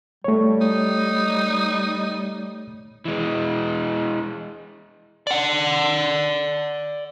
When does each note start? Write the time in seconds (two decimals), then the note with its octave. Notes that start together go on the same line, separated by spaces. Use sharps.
0.24 G3 A3 C#5
0.61 D#4
3.05 E3 G#3
5.27 D5 F#5